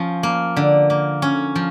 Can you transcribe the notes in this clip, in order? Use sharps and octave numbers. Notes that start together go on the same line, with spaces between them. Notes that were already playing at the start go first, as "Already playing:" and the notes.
Already playing: F3 C#4
A#3
D3
A#3
C#4
F3